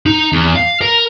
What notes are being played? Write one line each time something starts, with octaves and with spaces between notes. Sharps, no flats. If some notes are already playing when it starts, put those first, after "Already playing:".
D#4
E2
F5
A#4